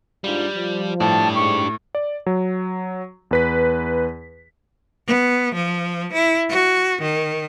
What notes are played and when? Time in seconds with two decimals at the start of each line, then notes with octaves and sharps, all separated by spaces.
0.24 G#2 G3 D4 F4
0.56 F3
1.00 A2 D4 G4 A5
1.35 G#2 C#6
1.95 D5
2.26 F#3
3.31 E2 B4 B6
5.07 B3
5.55 F3
6.14 E4
6.49 F#4
7.02 D#3